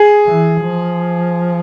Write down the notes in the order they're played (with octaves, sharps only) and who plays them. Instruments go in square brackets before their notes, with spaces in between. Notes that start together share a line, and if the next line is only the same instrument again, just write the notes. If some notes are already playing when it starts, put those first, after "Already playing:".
Already playing: [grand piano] G#4
[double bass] E3
F3